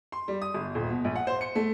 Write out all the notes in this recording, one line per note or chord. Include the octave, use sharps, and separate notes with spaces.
C6
G3
D#6
G1
D#1
B2
A#1
F#5
C5
C#7
A3